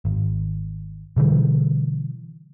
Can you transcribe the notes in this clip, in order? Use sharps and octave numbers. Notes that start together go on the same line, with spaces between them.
G#1
B2 D3 E3 G3